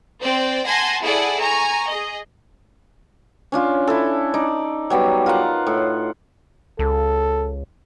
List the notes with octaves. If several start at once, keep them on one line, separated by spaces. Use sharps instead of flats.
C4 C5 D5 G5
F#5 G#5 A5 C6 G#6 A#6
E4 G#4 A4 D5 F#5 G#5
G#5 A#5 C#6
G#4 D#5
C#4 D4 F4
E4 A4
D#4 D5
F#3 G3 B3
F4 A#4 F#5
A2
C#2 A4